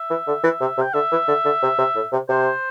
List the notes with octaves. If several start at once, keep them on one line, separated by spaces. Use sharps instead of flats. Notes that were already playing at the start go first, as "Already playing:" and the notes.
Already playing: E5
E3
D3
E3
C3
C3
G5
D3 E5
E3
D3
D3
C3
C3
A2
C3
C3 C5